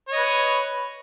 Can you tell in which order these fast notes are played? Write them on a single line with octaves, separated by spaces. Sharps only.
C#5 D#5 B4